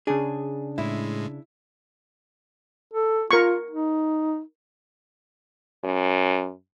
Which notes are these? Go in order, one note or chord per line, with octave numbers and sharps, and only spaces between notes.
C#3 D4 G#4
A2 G#3 E4
A4
F4 A#4 C#6
D#4
F#2